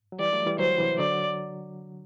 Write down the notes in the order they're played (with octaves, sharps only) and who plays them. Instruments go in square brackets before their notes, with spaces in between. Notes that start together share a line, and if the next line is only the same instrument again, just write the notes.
[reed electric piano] F#3
[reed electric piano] E3 G3 [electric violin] D5
[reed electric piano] F#3 A3
E3 G3
[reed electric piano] D3 F#3 [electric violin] C5
[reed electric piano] C3 E3
[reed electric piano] D3 F#3 [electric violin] D5